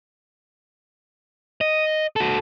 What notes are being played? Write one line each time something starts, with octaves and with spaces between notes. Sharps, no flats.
D#5
F#4 A4